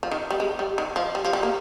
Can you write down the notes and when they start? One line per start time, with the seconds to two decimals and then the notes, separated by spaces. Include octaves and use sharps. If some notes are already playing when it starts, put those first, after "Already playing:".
0.03 F3
0.11 D#3
0.30 G3
0.40 G#3
0.59 G3
0.78 D#3
0.96 F3
1.15 G3
1.25 F3
1.33 G3
1.43 A#3